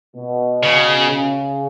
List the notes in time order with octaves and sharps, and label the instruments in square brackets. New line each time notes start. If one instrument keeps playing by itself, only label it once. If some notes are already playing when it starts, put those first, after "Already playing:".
[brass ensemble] B2
[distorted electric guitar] C#3
[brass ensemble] C#3